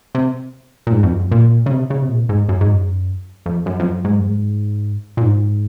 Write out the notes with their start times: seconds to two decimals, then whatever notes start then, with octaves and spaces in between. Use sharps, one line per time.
0.15 C3
0.87 A#2
0.93 G#2
1.03 F2
1.12 F#2
1.31 A#2
1.66 C#3
1.71 C3
1.90 C#3
2.02 C3
2.09 A#2
2.29 G#2
2.49 F#2
2.61 G#2
2.73 F#2
3.46 F2
3.66 F#2
3.80 F2
3.86 F#2
4.05 G#2
4.19 F#2
4.24 G#2
5.17 A#2
5.22 G#2